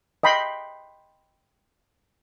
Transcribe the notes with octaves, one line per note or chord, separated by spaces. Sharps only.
D#5 G5 B5 C6